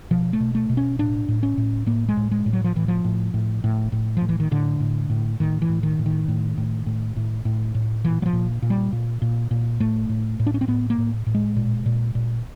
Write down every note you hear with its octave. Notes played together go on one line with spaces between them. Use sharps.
B2 F3
A3
B2
A3
B2
C#4
A2 D4
A2
C#4
A2
A2 A#3
G#3
A2
G#3
A2
F#3
F3
A2 E3
F3
A2
A2
A2
A2
A2 F3
E3
D#3
A2 D3
A2
A2
A2 D#3
E3
A2
D#3
A2
D#3
A2
A2
A2
A2
A2
A2
A#2 E3
F#3
F3
A#2
A#2
G3
A#2
A#2
A#2
A2 A3
A2
A2
D4
C#4
C4
A2 B3
A#3
A2
A2
G#3
A#2
A#2
A#2